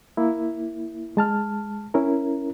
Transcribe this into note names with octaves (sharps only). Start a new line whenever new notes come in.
A#3 E4
G#3 A5 F6
C#4 E4 A#4